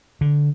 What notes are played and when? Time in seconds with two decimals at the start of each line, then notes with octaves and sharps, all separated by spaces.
0.21 D3